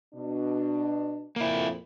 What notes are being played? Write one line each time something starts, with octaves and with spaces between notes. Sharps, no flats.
B2 D4
F2 A#2 A#3 E4